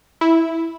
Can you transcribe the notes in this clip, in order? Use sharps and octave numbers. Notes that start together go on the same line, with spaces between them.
E4